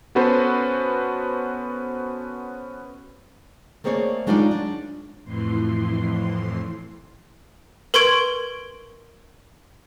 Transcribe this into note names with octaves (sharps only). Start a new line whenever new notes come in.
B3 C#4 F#4 A4 B4 C5
A3 A#3 C4 G#4 C#5 D5
F#3 G#3 D4 D#4 F4 D5
D4
F2 A2 E3 C6
A#4 B4 C6 C#6 G#6 D7